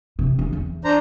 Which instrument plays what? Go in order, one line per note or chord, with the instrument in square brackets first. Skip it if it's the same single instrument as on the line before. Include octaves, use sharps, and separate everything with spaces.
[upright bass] C3
D3
E2
[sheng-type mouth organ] D4 C5 A#5